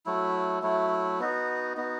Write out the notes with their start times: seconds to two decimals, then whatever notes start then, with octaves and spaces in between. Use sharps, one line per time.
0.06 F#3 A3 E4
0.62 F#3 A3 E4
1.20 B3 D#4 F#4
1.77 B3 D#4 F#4